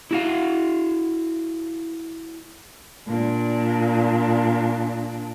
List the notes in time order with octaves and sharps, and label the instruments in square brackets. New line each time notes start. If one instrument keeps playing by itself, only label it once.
[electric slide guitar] E4 F#4 F5
[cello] A#2 D4